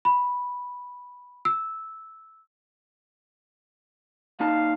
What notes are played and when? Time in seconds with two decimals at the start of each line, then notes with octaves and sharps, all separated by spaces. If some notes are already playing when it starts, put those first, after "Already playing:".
0.05 B5
1.45 E6
4.40 A#2 D#4 F5 A5